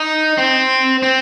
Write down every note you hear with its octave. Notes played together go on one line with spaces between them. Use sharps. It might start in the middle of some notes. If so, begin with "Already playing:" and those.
Already playing: D#4
C4
C4